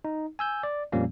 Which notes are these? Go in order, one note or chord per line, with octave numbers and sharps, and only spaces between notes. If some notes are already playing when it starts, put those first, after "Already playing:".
D#4
G#5 E6 G6
D5
F2 A#2 F3 G3 A#3 C#4